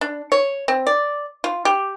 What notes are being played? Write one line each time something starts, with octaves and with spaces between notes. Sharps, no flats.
D4
C#5
C4
D5
F4
G4